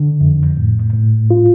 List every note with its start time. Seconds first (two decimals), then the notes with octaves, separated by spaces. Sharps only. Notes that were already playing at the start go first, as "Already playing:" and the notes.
Already playing: D3
0.21 F2
0.57 A2
0.93 A2
1.31 F4